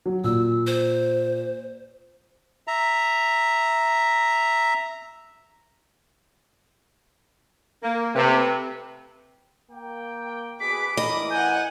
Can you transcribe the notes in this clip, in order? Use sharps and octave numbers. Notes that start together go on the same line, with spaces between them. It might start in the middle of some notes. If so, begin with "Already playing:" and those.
F#3
A#2 E6
C5
E5 A#5
A#3
C3 A3 G4 B4
A#3 G5
B2 G#4 B4 D6 B6
A2 E3 A#4 D#5 B5
F#5 G#5 G6